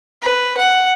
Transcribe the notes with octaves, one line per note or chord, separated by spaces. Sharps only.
B4
F#5